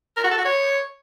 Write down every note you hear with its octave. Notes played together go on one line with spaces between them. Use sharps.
A#4
F#4
A4
F#4
C#5